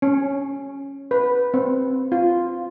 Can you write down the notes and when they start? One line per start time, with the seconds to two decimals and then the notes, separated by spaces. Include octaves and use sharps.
0.02 C#4
1.11 B4
1.54 C4
2.12 F4